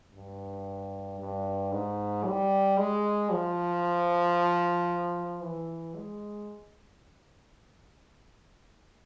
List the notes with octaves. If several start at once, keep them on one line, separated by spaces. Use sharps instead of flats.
G2
G2
G#2
G3
G#3
F3
E3
G#3